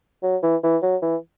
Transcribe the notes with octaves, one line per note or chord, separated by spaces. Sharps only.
F#3
E3
E3
F#3
E3